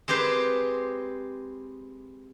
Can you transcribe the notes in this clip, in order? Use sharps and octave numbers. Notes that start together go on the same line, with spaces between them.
G#3 C4 G4 B4 C5